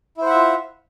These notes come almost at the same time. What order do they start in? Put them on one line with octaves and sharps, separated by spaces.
E4 C5 F#5 E5 F4